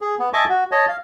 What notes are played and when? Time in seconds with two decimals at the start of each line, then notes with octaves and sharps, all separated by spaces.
0.01 G#4
0.19 B3
0.33 D#5 E5 G#5 A5 C#6 D6
0.49 F#4
0.72 C#5 D#5 A5
0.88 F5